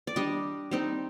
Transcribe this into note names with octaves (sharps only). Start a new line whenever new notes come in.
D5
G3 D4 D#5
G3 C4 D#4